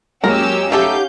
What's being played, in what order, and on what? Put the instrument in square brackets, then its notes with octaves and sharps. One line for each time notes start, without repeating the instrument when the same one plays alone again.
[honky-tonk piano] F#2 G#3 A#3 [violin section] C#4 G4 E6 [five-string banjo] A#4
[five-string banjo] A3 A4 [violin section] C#4 F5 G6 [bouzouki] D#4 G4 F#5